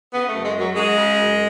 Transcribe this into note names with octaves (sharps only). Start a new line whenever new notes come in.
C#3 B3
F#2 A3
G#3
F#2 F#3
F#3 G#3
C#3
F#2